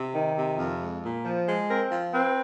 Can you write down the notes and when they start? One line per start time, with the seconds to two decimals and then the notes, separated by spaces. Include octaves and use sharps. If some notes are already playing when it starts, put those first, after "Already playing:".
Already playing: C3
0.15 D#3
0.37 C3
0.58 F2
0.81 G#3
1.03 A#2
1.25 F3
1.47 G#3
1.69 C4 A#4
1.92 F3
2.13 C4 B4